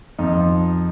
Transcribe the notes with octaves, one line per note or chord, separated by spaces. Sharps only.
F2 D#4
F3